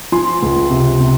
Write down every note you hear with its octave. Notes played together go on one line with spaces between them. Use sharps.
F3 G#5 C6
C#2
C3
C3